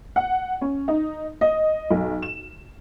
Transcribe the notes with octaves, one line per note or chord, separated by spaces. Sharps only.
F#5
C#4
D#4
D#5
B1
E7